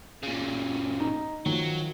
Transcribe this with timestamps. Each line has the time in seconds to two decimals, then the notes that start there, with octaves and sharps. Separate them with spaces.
0.23 A#2 C#3
1.00 D#4
1.46 D#3 F3 F#3